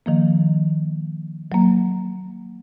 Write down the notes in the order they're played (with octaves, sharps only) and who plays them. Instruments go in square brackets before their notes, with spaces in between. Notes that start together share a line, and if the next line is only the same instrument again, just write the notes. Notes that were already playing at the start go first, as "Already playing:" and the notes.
[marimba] D#3 F3 A#3
F#3 A#3